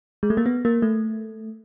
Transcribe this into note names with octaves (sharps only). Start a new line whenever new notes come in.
G#3
A3
A#3
B3
A#3
A3